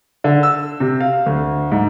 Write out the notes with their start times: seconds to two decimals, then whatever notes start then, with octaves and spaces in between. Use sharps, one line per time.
0.24 D3
0.43 E6
0.80 C3
1.00 F5
1.26 D2
1.71 G#2